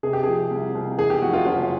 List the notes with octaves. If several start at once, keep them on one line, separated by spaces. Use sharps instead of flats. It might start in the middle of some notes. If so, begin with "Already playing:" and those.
C3 G#4
G4
F3 G#4
C2
C2
E3 G#4
G4
F2 F#4
F4
F#1 F4